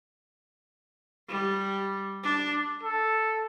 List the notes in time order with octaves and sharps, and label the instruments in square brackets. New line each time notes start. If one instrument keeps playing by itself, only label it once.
[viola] G3
D4
[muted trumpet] A4